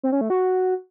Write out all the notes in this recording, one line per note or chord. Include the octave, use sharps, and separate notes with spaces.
C4
C#4
A3
F#4